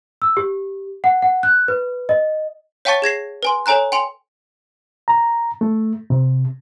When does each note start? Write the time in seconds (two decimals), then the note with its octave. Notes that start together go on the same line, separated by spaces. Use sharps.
0.22 E6
0.37 G4
1.04 F#5
1.22 F#5
1.43 F#6
1.68 B4
2.09 D#5
2.85 C#5 F5 G5 A5 C#6 A6
3.02 G#4 G#6 A#6 C7
3.43 B4 G#5 C6
3.66 A4 C#5 G#5 A#5 F#6
3.92 G5 G#5 C6 F7
5.08 A#5
5.61 A3
6.10 C3